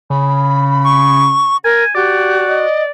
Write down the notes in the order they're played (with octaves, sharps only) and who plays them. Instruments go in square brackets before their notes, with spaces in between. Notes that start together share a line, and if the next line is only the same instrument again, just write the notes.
[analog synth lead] C#3 [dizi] B5
[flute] C#6
[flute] A#4 [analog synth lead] G#5
[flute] F#4 [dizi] G4 [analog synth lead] D5
[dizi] D#5